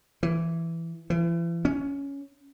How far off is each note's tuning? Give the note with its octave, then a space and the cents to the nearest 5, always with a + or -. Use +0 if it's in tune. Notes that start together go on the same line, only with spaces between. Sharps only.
E3 +10
E3 +40
C#4 +10